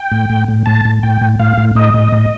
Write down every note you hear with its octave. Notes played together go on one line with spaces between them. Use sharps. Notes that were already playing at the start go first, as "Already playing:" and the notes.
Already playing: G5
A2
A2
A2
A2 A5
A2
A2 G5
A2
A2 F5
A2
A2 D#5
A2
A2